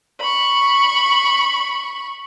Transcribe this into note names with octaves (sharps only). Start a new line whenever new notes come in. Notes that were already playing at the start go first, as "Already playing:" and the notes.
B5 C#6